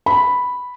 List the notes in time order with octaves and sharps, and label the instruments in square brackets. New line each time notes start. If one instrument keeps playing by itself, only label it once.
[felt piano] B5